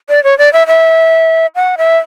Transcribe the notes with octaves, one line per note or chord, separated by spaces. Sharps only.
D5
C#5
D5
E5
E5
F#5
E5